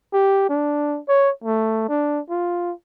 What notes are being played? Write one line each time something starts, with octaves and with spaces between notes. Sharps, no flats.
G4
D4
C#5
A3
D4
F4